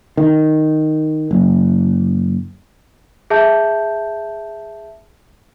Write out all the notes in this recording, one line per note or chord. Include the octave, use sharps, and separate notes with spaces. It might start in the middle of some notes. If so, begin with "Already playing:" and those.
D#3
F#1
G#4 E5 A5 G6